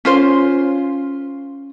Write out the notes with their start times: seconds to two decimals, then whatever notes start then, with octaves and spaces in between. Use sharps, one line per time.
0.05 C#4 F4 C5